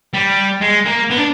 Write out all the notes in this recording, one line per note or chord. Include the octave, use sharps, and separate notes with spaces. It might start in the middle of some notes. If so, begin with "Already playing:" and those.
G3
G#3
A#3
B3
D4